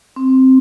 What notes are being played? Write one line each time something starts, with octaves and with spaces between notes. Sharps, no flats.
C4